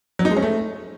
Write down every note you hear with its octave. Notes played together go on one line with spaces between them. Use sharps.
F#3
D#4
G#3
C#4
A3